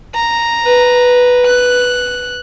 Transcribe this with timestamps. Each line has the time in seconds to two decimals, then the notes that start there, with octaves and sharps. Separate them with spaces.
0.15 A#5
0.66 B4
1.46 F#6